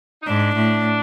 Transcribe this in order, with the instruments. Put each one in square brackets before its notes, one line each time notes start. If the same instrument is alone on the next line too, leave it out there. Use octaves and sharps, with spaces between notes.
[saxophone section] D#4
[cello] G#2 [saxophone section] D4
[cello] A2